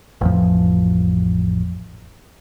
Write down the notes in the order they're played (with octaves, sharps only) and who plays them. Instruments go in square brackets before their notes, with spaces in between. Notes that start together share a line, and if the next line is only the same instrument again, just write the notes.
[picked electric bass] A1 F2 F3